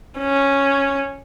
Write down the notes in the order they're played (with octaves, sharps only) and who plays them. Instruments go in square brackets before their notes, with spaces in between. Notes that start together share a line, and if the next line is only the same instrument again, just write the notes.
[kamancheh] C#4